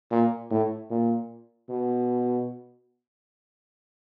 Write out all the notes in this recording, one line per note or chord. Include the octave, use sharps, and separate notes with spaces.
A#2
A2
A#2
B2